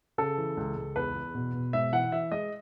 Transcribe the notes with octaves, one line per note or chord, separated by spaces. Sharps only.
C#3 A4
E3
C#2
C#2
E2 B4
E2
B2
B2
G#2 E5
E3 F#5
E3 E5
G#3 D#5